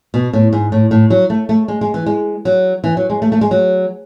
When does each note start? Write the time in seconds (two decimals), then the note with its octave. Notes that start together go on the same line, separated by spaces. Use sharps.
0.14 B2
0.33 A2
0.53 G#2
0.72 A2
0.91 A2
1.10 F#3
1.30 A3
1.49 A3
1.68 G#3
1.81 G#3
1.94 E3
2.06 G#3
2.45 F#3
2.84 E3
2.97 F#3
3.10 G#3
3.22 A3
3.32 A3
3.41 G#3
3.51 F#3